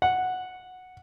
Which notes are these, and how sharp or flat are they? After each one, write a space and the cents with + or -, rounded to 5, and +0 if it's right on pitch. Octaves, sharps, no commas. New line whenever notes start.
F#5 -5